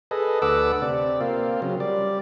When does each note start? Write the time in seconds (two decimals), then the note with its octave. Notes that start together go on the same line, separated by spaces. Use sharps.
0.11 G#4 A4 B4 D#5
0.42 D2 A4 B4 F#5 D6 E6
0.82 C3 D5
1.21 A#3 C4 F4
1.62 C#3 F#3 F4
1.80 G3 D5